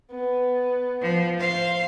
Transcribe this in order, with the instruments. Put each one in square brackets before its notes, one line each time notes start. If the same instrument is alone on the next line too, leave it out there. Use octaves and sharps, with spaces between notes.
[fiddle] B3
[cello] F3
[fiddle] C5 C6 [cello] F5